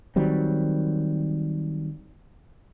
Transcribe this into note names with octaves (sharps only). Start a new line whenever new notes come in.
D#3 F#3 G3 C4